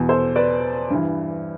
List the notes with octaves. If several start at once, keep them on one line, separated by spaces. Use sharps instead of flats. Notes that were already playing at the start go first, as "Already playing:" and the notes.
Already playing: E2 B2
A4 C5
B4 D5
G2 E3